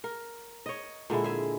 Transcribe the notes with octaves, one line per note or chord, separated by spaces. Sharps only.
A#4
C#5 D#5
A#2 D3 G#3 E4
G#4 E5